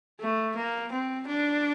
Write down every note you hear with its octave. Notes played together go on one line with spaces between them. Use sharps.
A3
A#3
C4
D4